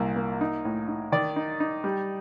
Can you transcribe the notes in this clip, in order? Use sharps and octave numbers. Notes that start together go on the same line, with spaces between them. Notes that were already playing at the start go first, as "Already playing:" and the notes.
Already playing: C2 A#2 A#3
A#3
D#4
A2
D#4
D#3 D5
D#4
D#4
G3